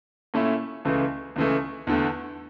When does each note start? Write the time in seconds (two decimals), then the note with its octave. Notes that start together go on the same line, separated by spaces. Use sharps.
0.34 A#2 A3 C#4 E4
0.85 C#2 C#3 E3 A3
1.36 C#2 C#3 E3 A3
1.87 E2 D3 A3